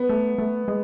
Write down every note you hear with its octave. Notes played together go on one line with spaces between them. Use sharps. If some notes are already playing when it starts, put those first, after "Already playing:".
Already playing: B3
A3
A3
G#3